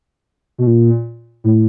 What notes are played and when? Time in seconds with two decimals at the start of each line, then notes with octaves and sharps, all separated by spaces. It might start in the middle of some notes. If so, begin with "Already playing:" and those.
0.58 B2
0.67 A#2
1.44 A2